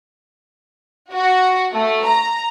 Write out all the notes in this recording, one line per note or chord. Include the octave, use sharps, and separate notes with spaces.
F#4
A3
A#5